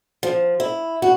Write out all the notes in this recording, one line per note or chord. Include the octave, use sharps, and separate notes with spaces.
F3
E4
F#4